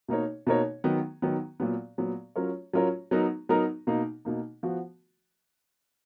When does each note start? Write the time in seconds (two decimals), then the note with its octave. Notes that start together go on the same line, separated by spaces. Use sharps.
0.08 B2 A#3 D#4 A#4 C#5
0.47 B2 A#3 D#4 A#4 C#5
0.84 D#3 F#3 B3
1.22 D#3 F#3 B3
1.60 A#2 F#3 B3
1.98 A#2 F#3 B3
2.36 F#3 C#4 F4 A#4 C#5
2.73 F#3 C#4 F4 A#4 C#5
3.11 F#3 B3 D#4 A#4
3.49 F#3 B3 D#4 A#4
3.87 B2 A#3 D#4
4.25 B2 A#3 D#4
4.63 F3 B3 F#4